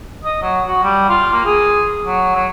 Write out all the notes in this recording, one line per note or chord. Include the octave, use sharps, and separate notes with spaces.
D#5
F#3
F#4
G3
F4
A#3
G#4
F#3
F#3